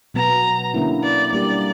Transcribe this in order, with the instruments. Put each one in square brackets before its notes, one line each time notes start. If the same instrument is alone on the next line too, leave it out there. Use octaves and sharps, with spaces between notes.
[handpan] B2 F#3 B3 [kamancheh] A#5
[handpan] D3 A#3 C#4 E4
[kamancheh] D5
[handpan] G3 A#3 D4 G4 [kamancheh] D5